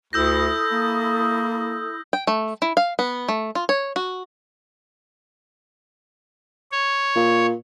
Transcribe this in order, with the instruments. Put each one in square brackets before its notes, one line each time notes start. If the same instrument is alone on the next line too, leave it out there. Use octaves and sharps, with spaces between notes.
[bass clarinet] D2 [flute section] E4 D#6 [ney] A4 [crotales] E6 G6 A#6
[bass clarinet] A#3
[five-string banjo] G5
A3
E4
F5
B3
A3
F4
C#5
F#4
[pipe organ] C#5
[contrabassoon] A#2